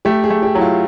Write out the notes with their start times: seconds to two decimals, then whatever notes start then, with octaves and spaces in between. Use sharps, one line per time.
0.05 A3 G4
0.24 G#4
0.30 A3
0.43 G4
0.55 F#3 E4
0.61 F4